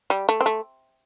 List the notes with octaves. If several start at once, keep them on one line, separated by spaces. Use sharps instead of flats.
G3
A3
C4
A3